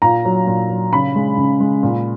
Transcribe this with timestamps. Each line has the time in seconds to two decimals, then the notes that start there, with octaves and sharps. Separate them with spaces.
0.02 A#2 A#5
0.25 F#3
0.47 A#2
0.69 F#3
0.93 C#3 B5
1.15 G#3
1.37 C#3
1.60 G#3
1.83 A#2